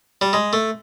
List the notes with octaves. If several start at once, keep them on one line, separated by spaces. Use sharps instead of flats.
G3
G#3
A3